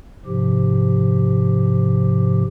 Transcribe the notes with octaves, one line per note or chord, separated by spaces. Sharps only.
G#2 C3 F3 G4